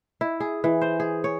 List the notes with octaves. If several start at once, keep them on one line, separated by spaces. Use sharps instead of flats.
E4
G#4
E3
C5
G#4
C#5